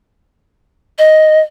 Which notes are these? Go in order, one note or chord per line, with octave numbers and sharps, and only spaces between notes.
D#5